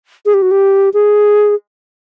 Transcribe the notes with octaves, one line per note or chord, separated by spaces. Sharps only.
G#4
G4
F#4
G4
G#4